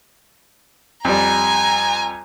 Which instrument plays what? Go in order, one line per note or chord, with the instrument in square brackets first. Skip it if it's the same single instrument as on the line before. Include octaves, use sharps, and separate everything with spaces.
[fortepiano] F2 G3 [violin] G#5 A#5